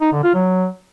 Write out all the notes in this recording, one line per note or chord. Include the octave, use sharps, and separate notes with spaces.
D#4
D3
F4
F#3